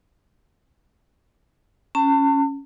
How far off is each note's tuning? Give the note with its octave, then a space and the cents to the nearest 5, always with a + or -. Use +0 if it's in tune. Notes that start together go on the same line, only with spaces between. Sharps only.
C#4 +0 A5 +40